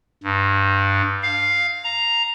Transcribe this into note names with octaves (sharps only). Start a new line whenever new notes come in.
G2
F5
A#5